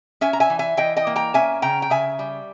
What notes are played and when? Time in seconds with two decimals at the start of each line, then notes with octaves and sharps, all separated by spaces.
0.21 C#4 E5 G#5
0.33 A#5
0.40 E5 G#5
0.50 E3
0.59 E5 G#5
0.77 E3 D#5 G5
0.97 D#5 G5
1.07 A#3
1.16 G5 A#5
1.34 C#4 E5 G#5
1.62 C#3 G5 A#5
1.82 G5
1.90 C#3 E5 G#5
2.19 G3